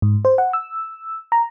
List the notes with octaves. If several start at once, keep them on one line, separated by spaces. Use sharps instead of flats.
G#2
C5
F#5
E6
A#5